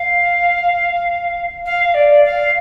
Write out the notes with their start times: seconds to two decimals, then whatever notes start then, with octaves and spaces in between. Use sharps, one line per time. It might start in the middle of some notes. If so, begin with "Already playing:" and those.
Already playing: F5
1.65 F5
1.94 D5
2.24 F5